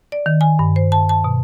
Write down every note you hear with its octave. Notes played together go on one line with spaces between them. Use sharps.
D5
D#3
G#5
G2
C5
A5
A5
B2